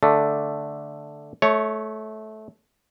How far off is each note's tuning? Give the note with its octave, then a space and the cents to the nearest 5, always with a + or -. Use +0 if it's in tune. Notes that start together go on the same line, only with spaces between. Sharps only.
D3 +0 A3 +0 D4 +0
A3 -20 C#5 +0